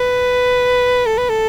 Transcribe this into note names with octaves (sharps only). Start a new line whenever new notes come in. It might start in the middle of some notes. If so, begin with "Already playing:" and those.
Already playing: B4
A4
B4
A4